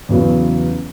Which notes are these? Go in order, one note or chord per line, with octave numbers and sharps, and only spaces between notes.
E2 C#3 F#3 B3